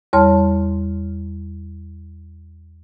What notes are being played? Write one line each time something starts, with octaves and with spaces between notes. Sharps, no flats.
E2 G3 C#5 A5 C6 F6